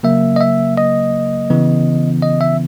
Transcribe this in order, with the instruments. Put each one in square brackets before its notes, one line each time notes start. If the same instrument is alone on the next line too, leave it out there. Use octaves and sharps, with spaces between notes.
[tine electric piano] C#3 F#3 A#3 E5
D#5
E5
D#5
C#3 E3 B3
D#5
E5